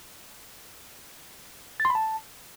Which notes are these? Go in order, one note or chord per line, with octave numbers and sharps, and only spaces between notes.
A6
C6
B5
A5